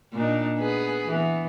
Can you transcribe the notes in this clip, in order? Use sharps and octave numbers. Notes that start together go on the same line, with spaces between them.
A#2 D4 D#4
B3 G#4 B4
E3 B3